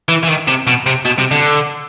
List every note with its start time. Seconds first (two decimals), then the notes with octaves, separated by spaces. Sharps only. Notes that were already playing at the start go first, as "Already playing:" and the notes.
0.09 E3
0.23 E3
0.28 D#3
0.47 C3
0.67 B2
0.86 C3
1.05 B2
1.18 C3
1.31 D3